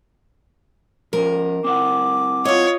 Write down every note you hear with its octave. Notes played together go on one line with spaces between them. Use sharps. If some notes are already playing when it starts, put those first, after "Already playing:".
F3 C#4 A#4
C4 E4 F#5 D6
F4 C#5 D#5